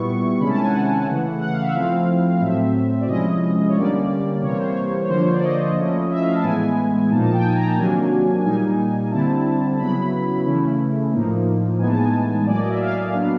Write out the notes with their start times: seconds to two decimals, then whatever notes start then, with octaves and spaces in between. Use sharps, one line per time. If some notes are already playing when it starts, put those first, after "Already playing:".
Already playing: A#2 G3 B3 E4 C#6
0.40 C3 D#3 G#3 C#4 E4 B5
0.49 A5
0.57 G#5
0.66 F#5
1.07 C#3 E3 A3
1.41 F#5
1.52 F5
1.63 E5
1.74 F3 A3 C4 E4 F5
2.35 F5
2.41 A2 F#3 A3 C4 E5
3.01 D5
3.07 C3 F3 G#3 C#4 E4 D#5
3.69 C#5
3.75 D3 G3 A#3 C#4 D5
4.42 C3 E3 G3 A#3 C#5
4.55 C5
4.67 C#5
5.05 C#5
5.09 D3 F3 A#3 C5
5.20 C#5
5.32 D5
5.43 D#5
5.76 F3 A3 C#4 E4
6.10 E5
6.21 F5
6.36 A5
6.43 A2 E3 G#3 B3 E4 G#5
7.11 A#2 F3 A#3 D#4 A5
7.22 A5
7.33 G5
7.43 G#5
7.55 A#5
7.66 A5
7.77 C3 D#3 F#3 A#3 D4 G#5
8.44 A#2 G3 A#3 D#4 G#5
9.11 D3 G3 C4 E4 A5
9.78 C#3 F#3 B3 E4 B5
10.46 C#3 E3 A3 C#4 E4
11.13 A2 F3 A#3 D#4
11.79 A2 E3 G#3 B3 D#4 G#5
11.88 A5
11.97 G#5
12.46 A2 F#3 A#3 D5
12.57 D#5
12.69 E5
12.80 F5
13.13 F#3 B3 D4